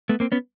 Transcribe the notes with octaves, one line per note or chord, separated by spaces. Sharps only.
A3 B3
A#3 C4
B3 C#4